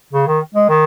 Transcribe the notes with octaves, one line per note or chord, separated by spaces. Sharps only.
C#3
D#3
G#3
D#3